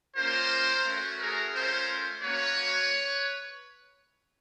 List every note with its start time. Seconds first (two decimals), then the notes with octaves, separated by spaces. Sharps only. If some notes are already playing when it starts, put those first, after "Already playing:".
0.16 A#3 C#4 F4 A#4 C5
0.86 A3 C#4 F#4
1.19 G#4 A#4
1.54 A3 C#4 F4 A#4 C5
2.23 A#3 C#4 F#4 B4 C#5